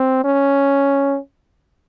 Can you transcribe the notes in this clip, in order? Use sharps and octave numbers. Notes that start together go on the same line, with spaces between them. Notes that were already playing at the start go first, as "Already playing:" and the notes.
Already playing: C4
C#4